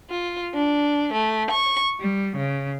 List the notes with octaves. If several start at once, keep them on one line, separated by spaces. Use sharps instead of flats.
F4
D4
A3
C#6
G3
C#3